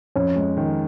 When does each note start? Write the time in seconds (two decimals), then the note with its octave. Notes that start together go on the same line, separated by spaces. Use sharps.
0.16 F2 C#4
0.36 G#3
0.57 D#3